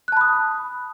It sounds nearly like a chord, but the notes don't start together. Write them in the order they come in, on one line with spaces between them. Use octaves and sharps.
F#6 A5 B5 D#6